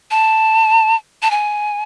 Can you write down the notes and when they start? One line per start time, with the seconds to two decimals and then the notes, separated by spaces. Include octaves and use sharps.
0.11 A5
1.23 A5
1.31 G#5